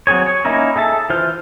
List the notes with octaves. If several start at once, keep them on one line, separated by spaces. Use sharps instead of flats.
F#3 C4 G#4 C#5
C#5
A#3 C#4 D#4 E4 A#4
G#4 A4 E5 A5
E3 F4 C5 F6